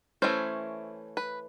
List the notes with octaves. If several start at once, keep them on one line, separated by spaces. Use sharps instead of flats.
E3 A3 C#4 C5
B4